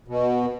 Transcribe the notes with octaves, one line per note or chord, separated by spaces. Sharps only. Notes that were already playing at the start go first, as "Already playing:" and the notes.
B2